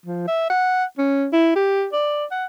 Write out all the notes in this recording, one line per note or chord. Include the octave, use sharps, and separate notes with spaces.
F3
E5
F#5
C#4
E4
G4
D5
F#5